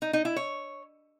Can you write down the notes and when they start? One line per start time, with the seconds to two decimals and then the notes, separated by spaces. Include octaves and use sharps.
0.02 D#4
0.13 D#4
0.25 E4
0.36 C#5